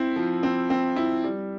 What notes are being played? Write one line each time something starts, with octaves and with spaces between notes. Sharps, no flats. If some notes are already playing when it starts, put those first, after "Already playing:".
Already playing: C4 E4
F3
C4
C4
E4
G3